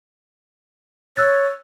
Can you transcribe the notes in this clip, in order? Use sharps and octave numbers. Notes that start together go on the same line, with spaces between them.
C#5 E6 F#6 A6